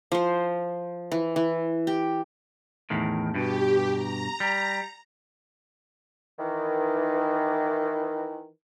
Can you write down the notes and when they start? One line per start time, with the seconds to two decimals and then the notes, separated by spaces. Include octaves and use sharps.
0.12 F3 C5
1.12 E3
1.36 E3
1.87 G4
2.90 E2 A2 D#3
3.35 G2 B2 G4
3.92 A#5
4.40 G3
6.39 D#3 E3